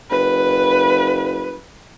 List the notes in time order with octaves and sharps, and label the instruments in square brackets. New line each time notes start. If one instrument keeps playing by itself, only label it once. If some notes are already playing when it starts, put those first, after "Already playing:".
[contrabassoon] F#1 [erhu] B4